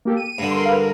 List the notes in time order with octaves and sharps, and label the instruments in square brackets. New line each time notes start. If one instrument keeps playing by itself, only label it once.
[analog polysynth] A#3 G4 A4
D#7
[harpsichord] G2 D3
[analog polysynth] A#4 C6
A#4 B4 F5
A#4